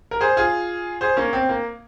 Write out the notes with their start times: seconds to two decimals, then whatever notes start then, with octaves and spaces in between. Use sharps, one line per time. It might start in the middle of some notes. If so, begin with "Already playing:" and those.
0.11 A#4
0.21 G#4 C5
0.37 F4 G#4
1.01 G#4 C5
1.17 A#3 C#4
1.33 C4
1.49 A#3